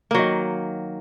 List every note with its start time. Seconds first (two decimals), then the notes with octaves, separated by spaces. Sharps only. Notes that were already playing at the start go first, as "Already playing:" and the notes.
0.11 A#3
0.15 F#3
0.18 D#3